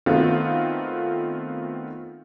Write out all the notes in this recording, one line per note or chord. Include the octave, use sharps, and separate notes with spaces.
D#3 A3 B3 C4 F4 F#4